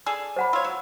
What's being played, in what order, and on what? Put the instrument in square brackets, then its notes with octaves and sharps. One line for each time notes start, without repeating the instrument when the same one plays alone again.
[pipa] G#4 A4 D5
[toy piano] C5 F#5 B5
[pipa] F4 C#5 [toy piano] E6
[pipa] F#3